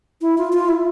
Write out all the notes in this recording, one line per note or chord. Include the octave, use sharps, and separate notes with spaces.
E4
F4
F4
E4